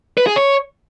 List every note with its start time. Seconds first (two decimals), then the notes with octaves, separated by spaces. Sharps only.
0.18 B4
0.27 G#4
0.36 C#5